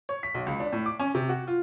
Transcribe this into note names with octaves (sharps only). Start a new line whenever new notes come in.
C#5
B6
B1
C#2
D4
A2
D6
C#4
C3
F#4
F4